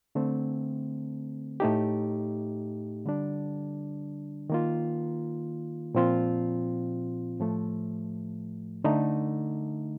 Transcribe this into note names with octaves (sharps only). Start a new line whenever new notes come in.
D3 A3 C4
A2 A3 D#4 G4
D3 G3 D4
D#3 A#3 F4
A#2 F3 C4 F4
A2 F3 A3
D3 A3 D#4